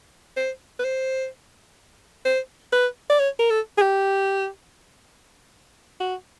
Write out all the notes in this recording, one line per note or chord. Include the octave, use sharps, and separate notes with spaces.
C5
B4
C5
C5
B4
D5
C#5
A#4
A4
G#4
G4
F#4